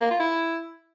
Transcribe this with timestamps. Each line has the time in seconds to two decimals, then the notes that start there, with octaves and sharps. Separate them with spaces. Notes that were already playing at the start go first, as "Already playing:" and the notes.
0.01 A#3
0.10 F4
0.20 E4